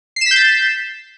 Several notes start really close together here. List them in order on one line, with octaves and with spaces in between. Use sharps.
C7 E7 B6 G6 A6